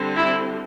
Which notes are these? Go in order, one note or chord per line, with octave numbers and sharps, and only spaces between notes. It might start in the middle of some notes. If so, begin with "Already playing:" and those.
Already playing: D3 G3 C4
E4